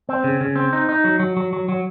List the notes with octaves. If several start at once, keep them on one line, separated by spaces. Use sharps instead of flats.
C4
C#3
C#3
C4
D#4
D#4
F#3
F#3
F#3
F#3
F#3